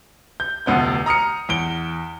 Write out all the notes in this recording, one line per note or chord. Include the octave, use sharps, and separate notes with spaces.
G6
F1 D2 B3 G6
A#5 D#6 F6 C#7
E2 D7 G7